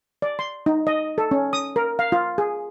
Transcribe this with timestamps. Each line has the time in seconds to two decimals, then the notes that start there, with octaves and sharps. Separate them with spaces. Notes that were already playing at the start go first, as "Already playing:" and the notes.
0.22 D5
0.39 C6
0.66 D#4
0.87 D#5
1.18 A4
1.31 C#4
1.53 D#6
1.76 A#4
1.99 F5
2.12 F4
2.38 G#4